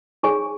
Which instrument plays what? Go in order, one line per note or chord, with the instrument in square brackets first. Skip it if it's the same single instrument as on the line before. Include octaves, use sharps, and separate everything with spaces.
[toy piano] D#4 G#4 C#5 G#5 C#6